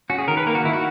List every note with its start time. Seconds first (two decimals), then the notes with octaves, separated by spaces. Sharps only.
0.10 C#4 F#4
0.18 G#4
0.28 D#3 A#4
0.37 B4
0.46 A#3 A#4
0.55 F#4
0.63 D#3 E4
0.73 F#4